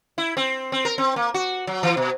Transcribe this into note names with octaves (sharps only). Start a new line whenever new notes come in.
E4
C4
C4
A#4
C4
A#3
F#4
F#3
E3
B2